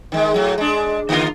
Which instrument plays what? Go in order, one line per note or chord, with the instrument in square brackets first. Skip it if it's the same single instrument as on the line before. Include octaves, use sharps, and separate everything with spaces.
[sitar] D#3 G#3
A2 F#3
G#3 D4
D3 A#3 F4